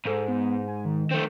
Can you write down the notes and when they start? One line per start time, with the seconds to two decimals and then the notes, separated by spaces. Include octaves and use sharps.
0.06 G#2 A4
0.28 B3
0.68 G#5
0.85 D#3
1.12 A3 C4